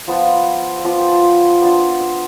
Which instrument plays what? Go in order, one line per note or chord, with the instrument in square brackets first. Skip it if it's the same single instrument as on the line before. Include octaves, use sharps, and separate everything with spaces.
[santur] F3 B3 F4 A5
F5
E6
F3 B3 F4 D6
G5
A5
B5
C6
E6
B3 D4 F4 D6
E6